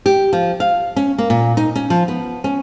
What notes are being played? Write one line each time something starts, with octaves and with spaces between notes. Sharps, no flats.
G4
F3
F5
C#4
A#3
A#2
D#4
C#4
F3
B3
C#4